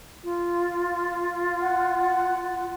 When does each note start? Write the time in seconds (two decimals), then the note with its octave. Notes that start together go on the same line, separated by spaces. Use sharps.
0.23 F4
1.61 F#5